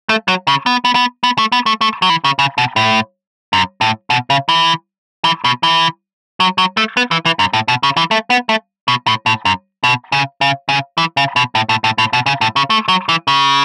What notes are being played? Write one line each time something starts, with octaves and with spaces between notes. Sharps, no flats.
A3
F#3
C#3
B3
B3
B3
B3
A3
B3
A3
A3
F#3
E3
C#3
C#3
B2
A2
F#2
A2
B2
C#3
E3
E3
B2
E3
F#3
F#3
A3
B3
E3
E3
F#2
A2
B2
C#3
E3
A3
B3
A3
B2
A2
A2
F#2
B2
C#3
C#3
C#3
E3
C#3
B2
A2
A2
A2
A2
B2
C#3
A2
C#3
A3
F#3
E3
C#3